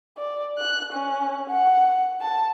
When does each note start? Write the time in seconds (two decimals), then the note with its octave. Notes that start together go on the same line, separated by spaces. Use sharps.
0.18 D5
0.58 F#6
0.93 C#4
1.49 F#5
2.21 A5